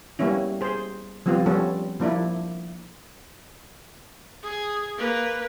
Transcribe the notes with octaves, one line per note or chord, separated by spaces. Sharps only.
G3 A#3 B3 C#4 E4
G#4 C5
F3 G3 B3 C4 F4
G3 B3 C#4 A4
F3 A#3 D4 E4
G#4
A#3 B4